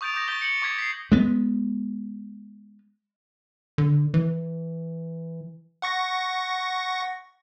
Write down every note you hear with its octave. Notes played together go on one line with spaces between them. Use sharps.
C#6 D#6 G6 A6 D7 F7
D6 D#6 G6 A#6
C#6 G6 A6 B6 G7
C#7 F#7
C#6 D6 G#6 B6
B6 C7
G#3 B3
D3
E3
F#5 C#6 A#6